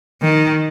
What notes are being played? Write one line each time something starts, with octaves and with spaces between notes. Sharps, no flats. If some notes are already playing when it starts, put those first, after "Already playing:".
D#3